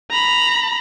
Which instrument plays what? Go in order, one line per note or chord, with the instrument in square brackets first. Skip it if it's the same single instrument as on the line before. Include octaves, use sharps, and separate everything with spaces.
[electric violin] A#5 B5